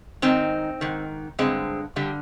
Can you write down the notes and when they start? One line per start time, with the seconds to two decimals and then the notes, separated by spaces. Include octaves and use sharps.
0.22 G#2 D#3 C4 D#4
0.81 G#2 D#3
1.39 G2 D3 G#3 C4
1.96 G2 D3 G3